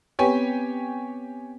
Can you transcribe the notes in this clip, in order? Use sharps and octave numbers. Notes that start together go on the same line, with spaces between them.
B3 C4 G4 B4 C#5 G#5